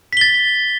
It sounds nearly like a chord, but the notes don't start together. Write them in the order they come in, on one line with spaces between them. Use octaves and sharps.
B6 G7 A6